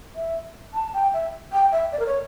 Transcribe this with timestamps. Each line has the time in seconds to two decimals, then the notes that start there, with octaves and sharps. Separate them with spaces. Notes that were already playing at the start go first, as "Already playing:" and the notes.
0.16 E5
0.74 A5
0.94 G5
1.14 E5
1.53 G5
1.72 E5
1.92 D5
1.99 A#4
2.06 C#5